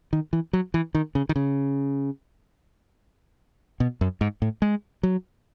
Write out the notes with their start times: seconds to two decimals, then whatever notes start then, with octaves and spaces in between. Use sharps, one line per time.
0.13 D#3
0.33 E3
0.53 F#3
0.74 E3
0.95 D#3
1.15 C#3
1.29 D#3
1.36 C#3
3.80 B2
4.01 F#2
4.21 G#2
4.42 A2
4.62 G#3
5.03 F#3